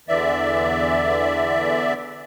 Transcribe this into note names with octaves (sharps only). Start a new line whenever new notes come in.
E2 D3 E3 D5 E5